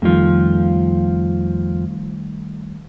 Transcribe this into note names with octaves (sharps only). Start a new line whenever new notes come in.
F2 D#3 F3 G3 A3